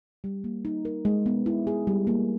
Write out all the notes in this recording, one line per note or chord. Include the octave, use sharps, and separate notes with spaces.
G3
A#3
D#4
A#4
G#3
B3
E4
G#4
G3
A#3